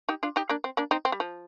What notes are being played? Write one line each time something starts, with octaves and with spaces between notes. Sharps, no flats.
D#4 G4
D4 F4
D#4 G4
A#3 D4
C4
A#3 D4
C4 D#4
C4
G3
F3